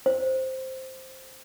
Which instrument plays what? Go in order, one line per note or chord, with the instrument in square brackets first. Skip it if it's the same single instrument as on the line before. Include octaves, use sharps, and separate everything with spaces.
[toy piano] C5